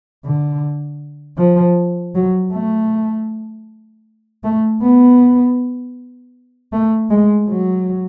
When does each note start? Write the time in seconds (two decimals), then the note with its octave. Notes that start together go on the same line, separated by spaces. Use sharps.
0.25 D3
1.38 F3
2.15 F#3
2.52 A3
4.44 A3
4.82 B3
6.72 A3
7.10 G#3
7.48 F#3